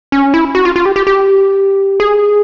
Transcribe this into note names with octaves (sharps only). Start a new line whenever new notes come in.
C#4
E4
F#4
F4
F4
G4
G4
G4
G#4